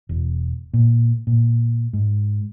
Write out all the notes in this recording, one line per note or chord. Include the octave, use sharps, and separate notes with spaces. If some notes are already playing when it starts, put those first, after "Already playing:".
E1
A#2
A#2
G#2